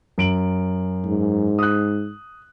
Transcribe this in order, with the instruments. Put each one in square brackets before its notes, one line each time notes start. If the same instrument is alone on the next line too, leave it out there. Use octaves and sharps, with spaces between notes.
[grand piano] F#2 D7 F#7
[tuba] G#2
[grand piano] D#6 F#6